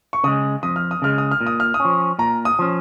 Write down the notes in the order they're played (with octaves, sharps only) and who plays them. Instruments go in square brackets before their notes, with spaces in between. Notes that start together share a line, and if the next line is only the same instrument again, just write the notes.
[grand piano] C#6
[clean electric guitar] C#3 G#3 [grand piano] D#6
[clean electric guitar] F2 [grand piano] D#6
[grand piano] F6
D#6
[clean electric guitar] C#3 G#3 [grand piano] F6
[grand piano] D#6
F6
[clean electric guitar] A#2
[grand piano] D#6
F6
D#6
[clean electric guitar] C#4
F3
[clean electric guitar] A#2 [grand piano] A#5
[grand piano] D#6
[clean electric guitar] F3 C#4